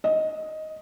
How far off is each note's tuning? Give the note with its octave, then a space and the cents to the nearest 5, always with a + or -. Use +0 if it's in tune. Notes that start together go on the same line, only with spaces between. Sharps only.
D#5 +5